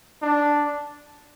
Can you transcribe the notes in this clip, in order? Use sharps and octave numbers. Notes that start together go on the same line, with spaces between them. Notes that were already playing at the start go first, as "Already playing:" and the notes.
D4